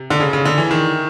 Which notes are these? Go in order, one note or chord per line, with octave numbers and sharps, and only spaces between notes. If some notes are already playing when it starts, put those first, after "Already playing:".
Already playing: C3
D3
C#3
C#3
D3
E3
D#3